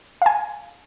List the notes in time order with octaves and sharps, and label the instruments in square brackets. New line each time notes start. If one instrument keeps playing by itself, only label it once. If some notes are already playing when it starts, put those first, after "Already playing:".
[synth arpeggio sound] F5 G#5